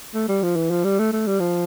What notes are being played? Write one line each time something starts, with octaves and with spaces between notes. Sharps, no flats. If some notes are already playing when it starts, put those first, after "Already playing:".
A3
G3
F3
E3
F3
G3
A3
A3
G3
F3